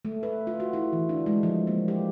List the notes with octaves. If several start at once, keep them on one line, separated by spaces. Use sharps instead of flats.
A3
B4
F4
F#4
E4
E3
D4
G#3
F3
A#3
G4